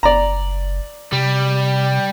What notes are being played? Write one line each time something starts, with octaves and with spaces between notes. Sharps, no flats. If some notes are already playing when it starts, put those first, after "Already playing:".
F#1 D5 A#5
C3 G3